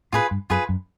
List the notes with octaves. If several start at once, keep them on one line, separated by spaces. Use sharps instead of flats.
A2 F4 G#4 B4
G2
F#2 F4 G#4 B4
F#2